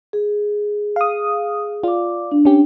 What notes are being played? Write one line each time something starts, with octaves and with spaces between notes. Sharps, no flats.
G#4
F5 D#6
F4 D5 D6
D4
C#4 G4